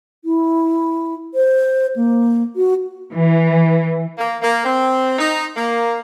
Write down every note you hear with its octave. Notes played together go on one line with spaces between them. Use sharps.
E4
C5
A#3
F#4
E3
A#3
A#3
C4
D#4
A#3